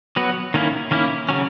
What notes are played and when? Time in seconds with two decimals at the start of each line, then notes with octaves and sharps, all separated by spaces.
0.16 F#3 B3 F#4 B4
0.54 D#3 A#3 C#4 E4
0.91 D#3 A#3 C#4 E4
1.29 C#3 F#3 C#4